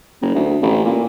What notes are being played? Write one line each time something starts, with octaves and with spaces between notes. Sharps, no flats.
F#1
D2
A1
A#2